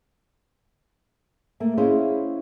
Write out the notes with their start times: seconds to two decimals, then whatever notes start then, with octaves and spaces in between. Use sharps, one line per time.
1.60 A3 A#3 A4
1.77 C#4 E4 G#4 C5 D#5 F5